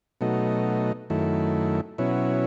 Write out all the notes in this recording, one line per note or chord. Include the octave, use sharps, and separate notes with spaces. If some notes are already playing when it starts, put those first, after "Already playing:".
B2 F#3 A3 D#4
F#2 D#3 A3 E4
B2 F#3 C#4 E4